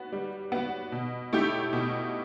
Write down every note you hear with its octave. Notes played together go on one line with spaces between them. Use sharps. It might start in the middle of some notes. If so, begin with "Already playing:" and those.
Already playing: B3 F#4
G3
B3 F#4
B2
A3 E4 G4
B2